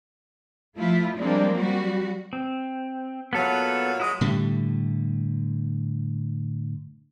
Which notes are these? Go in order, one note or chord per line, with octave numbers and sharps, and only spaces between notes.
F3 A3 E4 F4
G3 G#3 A#3 C4 D4
F#3 G3 F#4
C4
A#2 F#3 B3 A4 B4 F5
F#3 G#3 E4 F#4 D#6
A2 D3 G3